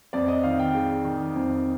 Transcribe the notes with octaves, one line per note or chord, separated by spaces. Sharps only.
F2 D5
D#5
D#3 F5
F5
G5
G#3
D#3
F2